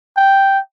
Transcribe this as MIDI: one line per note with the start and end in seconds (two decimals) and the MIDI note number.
0.17 0.59 79